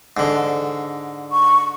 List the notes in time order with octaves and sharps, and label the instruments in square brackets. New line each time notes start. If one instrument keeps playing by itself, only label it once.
[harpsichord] G#2 D3
[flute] C#6